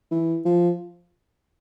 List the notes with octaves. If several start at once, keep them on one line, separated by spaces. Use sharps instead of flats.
E3
F3